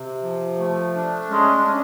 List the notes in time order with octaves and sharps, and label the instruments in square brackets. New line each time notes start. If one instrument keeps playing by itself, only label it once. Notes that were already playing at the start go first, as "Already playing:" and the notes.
Already playing: [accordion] C3
F3
A3
D4
[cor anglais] G#3 [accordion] C#4
[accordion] C#4